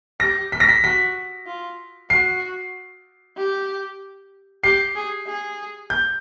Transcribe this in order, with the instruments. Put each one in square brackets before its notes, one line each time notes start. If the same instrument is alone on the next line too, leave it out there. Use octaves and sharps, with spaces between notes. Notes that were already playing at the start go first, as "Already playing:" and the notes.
[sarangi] G4 [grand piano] A#6
[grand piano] B6
A#6
B6
[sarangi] F#4 [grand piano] B6
[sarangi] F4
[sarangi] F#4 [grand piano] C7
[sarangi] G4
[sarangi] G4 [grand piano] C7
[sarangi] G#4
G#4
[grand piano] G6